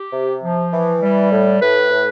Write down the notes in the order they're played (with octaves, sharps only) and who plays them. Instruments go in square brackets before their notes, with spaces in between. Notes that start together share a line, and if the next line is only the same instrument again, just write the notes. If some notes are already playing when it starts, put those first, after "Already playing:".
Already playing: [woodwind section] G4
C3
F3
E3
G3
A2
A2 B4
A2